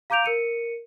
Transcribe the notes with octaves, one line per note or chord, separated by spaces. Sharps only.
F5 A#5 D6 G6 D7 F7
A#4 C#7 D#7